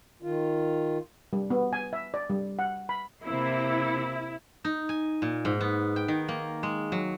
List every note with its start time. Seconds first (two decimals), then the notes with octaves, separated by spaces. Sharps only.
0.22 D#3 F4
1.33 G3
1.50 B3
1.73 G#5
1.93 E5
2.14 D5
2.30 G3
2.59 F#5
2.89 B5
3.24 C3 A#3 E4
4.64 D#4
4.89 G#5
5.22 A#2
5.45 G#2
5.61 B3
5.96 G5
6.08 D#3
6.28 A#3
6.63 G#3
6.92 F#3